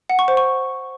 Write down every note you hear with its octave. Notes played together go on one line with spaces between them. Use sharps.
F#5
C#6
C5
C#6